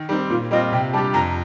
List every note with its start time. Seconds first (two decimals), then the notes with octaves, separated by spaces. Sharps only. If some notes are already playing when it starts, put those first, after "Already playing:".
Already playing: D#3
0.09 G3 D#4
0.12 C4
0.30 A#2 F4
0.51 G3 C4 F4 D#5
0.72 C3 G5
0.93 G3 D4 G4 A5
1.14 F2 A#5